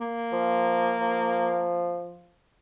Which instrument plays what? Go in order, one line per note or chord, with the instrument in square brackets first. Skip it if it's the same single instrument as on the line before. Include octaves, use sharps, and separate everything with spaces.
[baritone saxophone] A#3
[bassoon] F3
F3